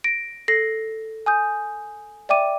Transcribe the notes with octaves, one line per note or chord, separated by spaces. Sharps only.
A#6 D7
A4 A#6 C7
G#5 D#6 G6
D5 E5 G5 D6 D#7